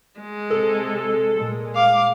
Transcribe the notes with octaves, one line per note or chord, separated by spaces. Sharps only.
G#3
C3 A4
A#2 G#3
F5 D6